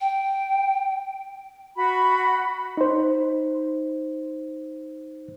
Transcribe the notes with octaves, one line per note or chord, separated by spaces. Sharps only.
G5
F#4 B5
D#4 C5